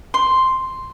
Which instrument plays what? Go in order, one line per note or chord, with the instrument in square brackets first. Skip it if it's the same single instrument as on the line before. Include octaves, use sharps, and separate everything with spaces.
[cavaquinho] C6